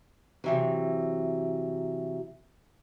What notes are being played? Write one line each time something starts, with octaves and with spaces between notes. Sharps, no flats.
C3 E3 F#3